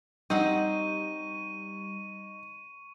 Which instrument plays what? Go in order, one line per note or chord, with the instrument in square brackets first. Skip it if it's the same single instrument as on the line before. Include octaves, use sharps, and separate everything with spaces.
[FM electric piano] G3 [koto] C4 F#5 [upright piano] D#4 [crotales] C#6 D#7